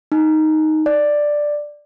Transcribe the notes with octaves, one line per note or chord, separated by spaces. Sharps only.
D#4
D5